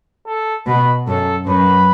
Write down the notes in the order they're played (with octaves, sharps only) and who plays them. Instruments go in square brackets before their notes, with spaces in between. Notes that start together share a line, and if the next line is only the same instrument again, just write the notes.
[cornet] A4
[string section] B2 [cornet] B4
[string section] F#2 [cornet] A4
[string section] F#2 [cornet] B4